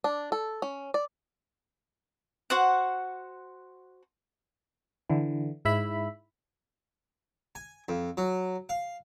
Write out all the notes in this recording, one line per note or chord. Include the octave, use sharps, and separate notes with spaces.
D4
A4
C#4
D5
F#4 C5 F#5
D3 E3
G#2 E4 E5 B5
G#5
F2
F#3
F5